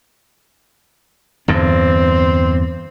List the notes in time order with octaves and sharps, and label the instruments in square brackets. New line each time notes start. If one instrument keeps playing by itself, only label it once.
[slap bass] E2 G2 D3 [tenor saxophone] C4